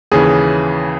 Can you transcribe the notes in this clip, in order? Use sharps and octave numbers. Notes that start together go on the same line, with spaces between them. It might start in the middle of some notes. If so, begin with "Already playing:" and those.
D#2 C#3 E3 G#4